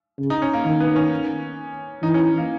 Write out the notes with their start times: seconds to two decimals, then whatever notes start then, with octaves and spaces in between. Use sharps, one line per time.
0.19 C#3
0.30 D#4
0.42 C#4
0.53 A#3
0.65 D#3 A#3
0.80 B3
0.96 C#4
2.03 E3 D#4
2.14 C#4
2.38 A#3